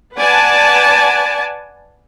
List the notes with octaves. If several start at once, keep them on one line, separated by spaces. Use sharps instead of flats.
B4 D5 F#5 G#5 A5